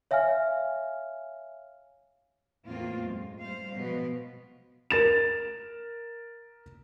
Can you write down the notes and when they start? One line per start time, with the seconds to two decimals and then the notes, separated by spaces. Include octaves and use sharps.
0.11 C#5 E5 F5 G#5 F6
2.67 E2 A2 A#3 C4 F4
3.04 F#2 G#3
3.39 G3 C5 F5
3.74 B2 F3 G#3 B3
4.90 A#4 A6 E7